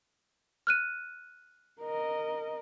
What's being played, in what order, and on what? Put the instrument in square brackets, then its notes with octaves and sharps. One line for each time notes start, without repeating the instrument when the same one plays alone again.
[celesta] F6 F#6 D#7
[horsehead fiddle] A#4 D#5